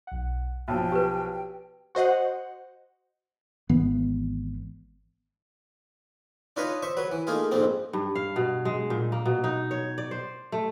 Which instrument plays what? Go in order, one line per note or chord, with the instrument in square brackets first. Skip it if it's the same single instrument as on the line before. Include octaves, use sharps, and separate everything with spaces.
[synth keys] B1 F#5
[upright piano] B1 F3 [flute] G5 [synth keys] A5
[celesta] G4 B4
[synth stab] F#4 C5 D#5 F#5
[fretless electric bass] G#1 E3 B3
[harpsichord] D4 D#4 F4 B4 C#5 D#5
C5 E5 C#6
F#3 B4
E3
A3 A#3 D#4 F4 G#4
A#1 F2 G#2 A#3 C4
[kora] G2
F5
B2
G#3
A#2
A#3
B2
D#4
C#5
D5
C5
A3